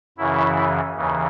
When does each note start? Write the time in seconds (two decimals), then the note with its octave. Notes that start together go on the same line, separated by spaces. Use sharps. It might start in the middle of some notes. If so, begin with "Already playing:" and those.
0.18 F#2 C#3 E3 E4
0.96 D#2 C#3 E3